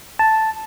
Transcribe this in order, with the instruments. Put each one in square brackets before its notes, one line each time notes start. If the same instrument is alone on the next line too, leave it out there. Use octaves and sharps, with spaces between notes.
[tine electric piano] A5